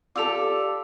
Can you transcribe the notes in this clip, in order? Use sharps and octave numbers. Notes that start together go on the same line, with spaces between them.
F4 G4 A4 D5 D6 E6 F7